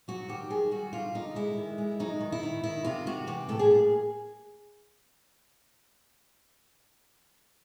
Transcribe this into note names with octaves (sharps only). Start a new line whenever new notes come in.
F#3 F#4
D#3 G4
D#3 G#4
G3 F#4
D3 F4
D3 D#4
G#3 E4
D#3
G#3
F#3 D#4
D#3
E4
D#3
D#3 E4
C3 F4
C3 F#4
E3 G4
A2 A4
G#4
A#3